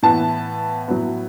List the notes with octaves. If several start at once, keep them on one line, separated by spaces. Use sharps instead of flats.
A2 E3 B3 A5
A2 F#3 B3